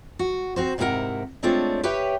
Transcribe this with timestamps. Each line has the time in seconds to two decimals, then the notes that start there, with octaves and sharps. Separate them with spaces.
0.19 F#4
0.56 C4 F#4 C5
0.78 G#2 C3 E4 G#4 A#4 F#5
1.43 G#3 A3 C4 D4 F4 C#5
1.83 G4 B4 C#5 E5 G5